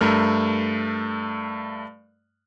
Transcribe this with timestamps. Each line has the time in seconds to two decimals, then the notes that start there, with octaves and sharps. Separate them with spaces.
0.01 G2 A3 A#4 F6